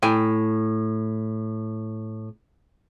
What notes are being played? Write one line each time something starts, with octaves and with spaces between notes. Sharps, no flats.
A2 G5 G#5